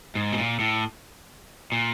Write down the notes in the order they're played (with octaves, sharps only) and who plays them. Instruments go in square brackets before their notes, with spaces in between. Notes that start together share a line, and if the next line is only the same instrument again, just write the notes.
[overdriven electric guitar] G#2
B2
A#2
A2
A#2